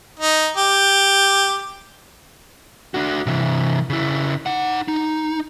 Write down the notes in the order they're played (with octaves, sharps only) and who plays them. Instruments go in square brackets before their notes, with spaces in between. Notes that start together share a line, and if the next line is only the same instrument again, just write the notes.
[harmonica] D#4
G4
[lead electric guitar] D4 F#4
C3 E3
C#3 E4
D#4 F#5
D#4